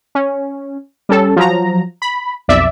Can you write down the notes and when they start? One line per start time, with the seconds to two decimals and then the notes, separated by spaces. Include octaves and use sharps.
0.15 C#4
1.09 G3 C#4 A4
1.36 F3 F#3 A#5
2.02 B5
2.48 B1 F2 D5 E5